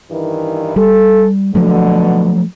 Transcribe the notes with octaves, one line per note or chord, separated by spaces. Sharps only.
G2 D#3 E3
G3 A4
B2 D3 F3 F#3 A3